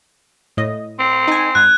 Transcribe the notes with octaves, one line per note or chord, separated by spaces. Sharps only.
A2 D#5
C4
D#4 G#5
G#2 F#6 G#6